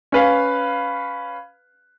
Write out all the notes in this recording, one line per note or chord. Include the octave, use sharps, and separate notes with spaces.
C#4 B4 F5